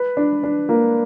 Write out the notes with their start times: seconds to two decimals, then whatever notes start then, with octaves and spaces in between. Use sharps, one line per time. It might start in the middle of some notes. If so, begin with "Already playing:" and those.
Already playing: B4
0.17 D4
0.44 D4
0.69 A#3